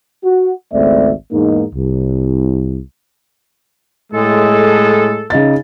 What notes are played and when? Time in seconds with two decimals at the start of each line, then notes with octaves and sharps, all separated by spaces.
0.24 F#4
0.73 G#1 C#2 A3 C4 D5 E5
1.31 E2 G#2 A#3 D#4
1.75 C2
4.12 A2 G#3 A4
5.30 C#3 D#4 A6